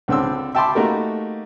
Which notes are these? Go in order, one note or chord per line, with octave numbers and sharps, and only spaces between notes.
C#2 D3 C4 D4 E6
E5 G5 A5 B5 C6 D6
A3 A#3 D#4 F#4 G4 A#4